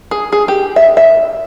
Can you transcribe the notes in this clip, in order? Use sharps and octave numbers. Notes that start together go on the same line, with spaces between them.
G#4
G#4
G4
E5
E5